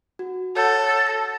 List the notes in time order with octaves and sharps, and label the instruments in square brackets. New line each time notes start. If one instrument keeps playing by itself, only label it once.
[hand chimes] F#4
[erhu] A4 [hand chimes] C#5 F#5 G6
[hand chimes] A#6